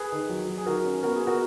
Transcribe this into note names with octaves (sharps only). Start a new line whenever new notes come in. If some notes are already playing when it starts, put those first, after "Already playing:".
Already playing: G#4 B4
D#3
F#3
F#3
G#4
D#3 F#4 A#4
C#4
B3 F#4 A#4
G#4
B3
F#4 A#4